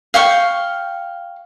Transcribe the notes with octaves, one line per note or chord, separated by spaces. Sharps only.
F5 G5 C#6